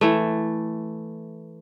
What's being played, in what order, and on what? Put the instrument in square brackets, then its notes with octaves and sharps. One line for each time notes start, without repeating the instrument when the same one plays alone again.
[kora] E3 A3